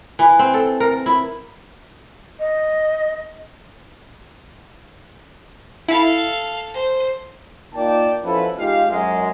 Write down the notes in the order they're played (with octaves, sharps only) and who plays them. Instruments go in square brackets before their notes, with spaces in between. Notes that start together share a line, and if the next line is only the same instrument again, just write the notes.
[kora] E3
C4
A4
A#4
E4
[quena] D#5
[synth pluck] E4 [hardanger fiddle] A4 F5
[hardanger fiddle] C5
[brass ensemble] A#3 D#4 F4 D5 G5 A5
B2 F3 C#4 E4 A4 B4
G#3 D#4 F4 G4 F5
F#2 G#3